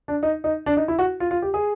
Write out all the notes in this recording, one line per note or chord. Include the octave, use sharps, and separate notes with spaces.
D4
D#4
D#4
D4
D#4
E4
F#4
F4
F4
G4
G#4